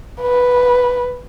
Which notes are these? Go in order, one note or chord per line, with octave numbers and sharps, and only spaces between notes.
B4